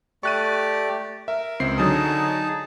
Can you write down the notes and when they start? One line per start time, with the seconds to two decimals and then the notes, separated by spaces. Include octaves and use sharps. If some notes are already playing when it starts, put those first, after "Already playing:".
0.23 A3 G4 D5 C#6 F#6 D#7
1.28 A#4 E5
1.60 C#2 C4 C7
1.78 D3 F#3 D#4 G#4 A5 D#6